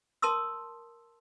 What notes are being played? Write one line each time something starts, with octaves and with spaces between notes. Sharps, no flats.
A#4 A5 C6 D#6 E6